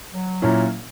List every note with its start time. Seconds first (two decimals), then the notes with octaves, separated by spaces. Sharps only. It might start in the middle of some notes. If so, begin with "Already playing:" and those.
0.13 F#3
0.42 A#2 A#3 C#4 E4